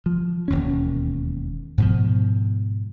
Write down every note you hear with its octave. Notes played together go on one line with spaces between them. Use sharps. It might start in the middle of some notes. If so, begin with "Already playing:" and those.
F3
E1 D#2 C#4
G#2 B2 F3